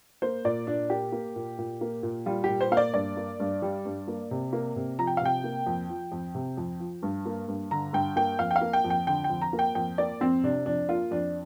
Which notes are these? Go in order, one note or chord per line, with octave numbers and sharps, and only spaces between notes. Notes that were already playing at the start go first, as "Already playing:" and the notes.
A#3 C5
A#2 D5
A#2 D4
A#3 G4
A#3
A#2
A#2
A#3
A#2
G3 F4
A#2 G4
C5
A#3 F5
D5
G2 D5
A#3
G2
G3
G2
A#3
C3
A#3
C3
F3 A#5
G5
F5
C3 G5
A#3
F2
F3
F2
C3
F2
F3
G2
A#3
G2
D3 A#5
G2 G5
A#3 G5
F2 F5
G5
F5
A#3
G5
F2
G5
D3 G5
G5
F2
A#5
A#3
G5
F2 G5
A#3 D5
F2 C4
C3 D4
F2 D4
A#3 F4
F2 D4